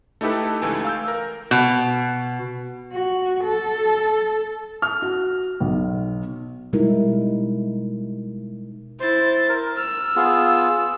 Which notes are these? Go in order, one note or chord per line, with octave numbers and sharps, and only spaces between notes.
A3 D#4 E4 G4 A4 B4
C#2 E3 A3 G#5
F5 E6 G6
A#4
B2
F#4
A4
F6
F#4
B1
B2 G3 G#3 D#4 E4 A#4
E4 C5 C6 A6
A#4
E6 F6
B3 F4 G#4